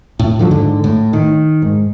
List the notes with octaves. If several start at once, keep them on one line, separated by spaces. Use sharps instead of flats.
A2
D3 F3 F#3
G#2 D3
A2
D#3
G#2